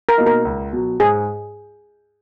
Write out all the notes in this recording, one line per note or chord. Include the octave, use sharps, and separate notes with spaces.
A#4
B2 A#3 D#4
A#4
C#2
B2 F#3
G#2 G#4